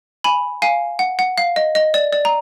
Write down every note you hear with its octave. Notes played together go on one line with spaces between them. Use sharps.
G#5 B5
F5 G#5
F#5
F#5
F5
D#5
D#5
D5
D5
A#5